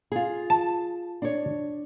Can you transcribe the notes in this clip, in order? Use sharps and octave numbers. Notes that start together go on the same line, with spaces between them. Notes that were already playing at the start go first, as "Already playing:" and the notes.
F4 G#4
A5
D4 C#5